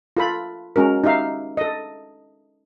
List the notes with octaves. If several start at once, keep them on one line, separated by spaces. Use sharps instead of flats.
F4 A4 B5
G#3 C#4 F#4 A#4
D#4 G4 E5 F5
A4 D#5